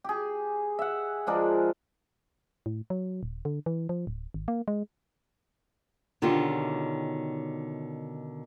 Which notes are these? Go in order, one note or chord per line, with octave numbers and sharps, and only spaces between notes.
G4 G#4
E5 F#5
F3 G#3 D4 A#4
A2
F#3
D#1
D3
E3
F3
D1
G#1
A#3
G#3
B2 D3 D#3 C#4 F4 G4